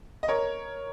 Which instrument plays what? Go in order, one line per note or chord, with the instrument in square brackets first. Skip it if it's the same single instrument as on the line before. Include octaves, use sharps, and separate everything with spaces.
[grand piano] D#5
A#4 C#5